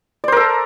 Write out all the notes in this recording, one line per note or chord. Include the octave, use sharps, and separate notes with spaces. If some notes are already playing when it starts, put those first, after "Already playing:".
A4 A#4 C5 D5